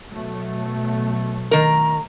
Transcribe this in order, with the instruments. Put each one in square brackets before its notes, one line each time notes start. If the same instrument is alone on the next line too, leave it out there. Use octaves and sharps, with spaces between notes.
[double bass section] B2 F#3 A3
[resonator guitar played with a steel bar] D#3 A#4 [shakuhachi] A#5